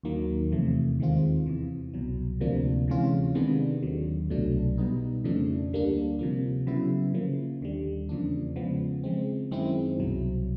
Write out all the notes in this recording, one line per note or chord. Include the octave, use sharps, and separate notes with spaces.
D#2 D#3 F#3 A#3
E2 C3 F3 A3
D#2 D#3 G#3 C4 F4
E2 C3 E3
C2 B2 F#3
D2 C3 F3 A#3 D4
C3 E3 G#3 C#4 F4
C3 D#3 G#3 B3 D4
D#2 D3 F#3
C2 B2 F#3 A3 D4
B2 G3 B3 D#4
F2 C#3 F3 A3 D4
D2 D3 G3 A#3 D4
C3 F3 A#3
C#3 F#3 B3 E4
C#3 F3 A#3
D#2 D3 G3
E2 C#3 F3 A#3 D4
C#3 F3 G#3 B3
C#3 F3 G#3 C4
F#2 D#3 G#3 C4 E4
C2 B2 F#3